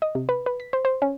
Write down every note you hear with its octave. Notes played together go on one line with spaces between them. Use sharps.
D#5
C3
B4
B4
B6
C5
C5
C#4